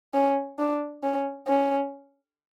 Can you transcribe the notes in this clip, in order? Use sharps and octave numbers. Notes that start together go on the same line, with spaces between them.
C#4
D4
C#4
C#4